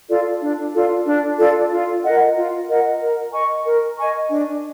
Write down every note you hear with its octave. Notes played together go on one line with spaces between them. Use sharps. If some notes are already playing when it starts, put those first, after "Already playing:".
F4 A4 D5
D4
F4 A4 D5
D4
F4 A4 D5
F4
A#4 D#5 F#5
F4
A#4 D#5 F#5
A#4
D#5 G#5 C#6
A#4
D#5 G#5 C#6
D4